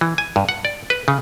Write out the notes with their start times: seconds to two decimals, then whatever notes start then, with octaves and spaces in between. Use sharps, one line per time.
0.01 E3
0.18 G#5
0.36 G2
0.49 F#5
0.65 D5
0.90 B4
1.08 C#3